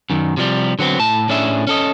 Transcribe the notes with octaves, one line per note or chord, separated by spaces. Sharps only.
F#2 D#3
C3 F3 G3
D3 F#3 B3 C4
A2 A5
A2 C#4 D4 G#4 E5
C#4 A4 D#5